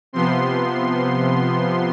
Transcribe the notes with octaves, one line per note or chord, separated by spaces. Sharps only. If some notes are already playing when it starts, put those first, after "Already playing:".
C3 F3 B3 C6